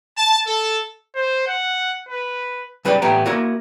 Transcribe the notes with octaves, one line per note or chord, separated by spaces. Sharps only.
A5
A4
C5
F#5
B4
C#3 G3 B4 D5 A#5 B5
A2 E3 B3 G4 G5 A#5
A#3 E4 F#4 A#4